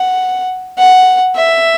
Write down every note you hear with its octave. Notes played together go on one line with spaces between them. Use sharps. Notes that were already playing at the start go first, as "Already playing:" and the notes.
Already playing: F#5
F#5
E5